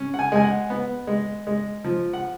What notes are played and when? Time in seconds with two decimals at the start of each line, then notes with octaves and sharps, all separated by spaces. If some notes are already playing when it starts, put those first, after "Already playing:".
Already playing: C#4
0.14 F#5
0.19 G#5
0.32 G#3 G#5
0.44 F#5
0.70 B3
1.07 G#3
1.47 G#3
1.84 F3
2.13 F#5